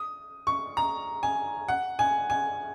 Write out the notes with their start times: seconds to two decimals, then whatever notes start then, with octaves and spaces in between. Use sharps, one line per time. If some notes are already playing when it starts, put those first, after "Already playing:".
Already playing: D#6
0.47 C#6
0.77 A#5
1.23 G#5
1.68 F#5
1.99 G#5
2.30 G#5